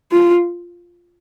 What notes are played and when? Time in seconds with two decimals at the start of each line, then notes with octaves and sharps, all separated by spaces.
0.12 F4